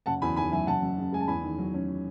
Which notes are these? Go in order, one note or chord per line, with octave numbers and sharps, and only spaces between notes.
F#1 F#5 A5
E2 G#5 B5
D#3 G#5 B5
F#3 E5 G#5
F#1 F#5 A5
F#2
C#3
G#3 G#5
A5
E2 G#5 B5
D#3
F#3
C#4